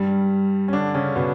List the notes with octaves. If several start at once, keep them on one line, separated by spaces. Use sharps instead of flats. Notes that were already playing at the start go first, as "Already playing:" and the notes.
Already playing: G2 G3
C#4
D3 D4
C#3 C#4
B2 B3